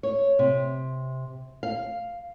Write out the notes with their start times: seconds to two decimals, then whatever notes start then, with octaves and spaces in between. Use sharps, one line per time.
0.03 C#5
0.39 C3
1.63 F5